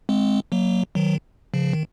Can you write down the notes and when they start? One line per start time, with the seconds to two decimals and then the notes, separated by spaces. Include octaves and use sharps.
0.09 G#3 C4
0.52 F#3 A#3
0.95 D#3 F#3
1.54 C#3 F3
1.73 D#3